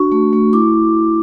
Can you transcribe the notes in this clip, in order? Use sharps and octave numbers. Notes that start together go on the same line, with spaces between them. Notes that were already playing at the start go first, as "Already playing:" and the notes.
Already playing: D4 F#4 C#6
A3
A3
E4 D6